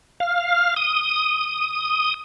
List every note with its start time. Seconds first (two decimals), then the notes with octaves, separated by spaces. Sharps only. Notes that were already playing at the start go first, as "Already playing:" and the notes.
0.20 F5
0.76 D#6